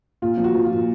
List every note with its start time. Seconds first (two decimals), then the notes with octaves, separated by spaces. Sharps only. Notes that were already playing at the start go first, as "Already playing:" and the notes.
0.22 A#2 F4
0.38 F3
0.44 F#4
0.54 F3
0.65 F4
0.72 A#2